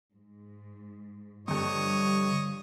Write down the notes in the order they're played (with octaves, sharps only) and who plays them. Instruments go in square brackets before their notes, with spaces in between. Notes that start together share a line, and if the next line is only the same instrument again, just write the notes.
[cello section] G#2
[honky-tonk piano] G2 C#6 [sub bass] D3 [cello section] F3 G3 [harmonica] C#5 D#5